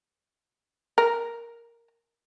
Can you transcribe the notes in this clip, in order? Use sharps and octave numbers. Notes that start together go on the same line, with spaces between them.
A#4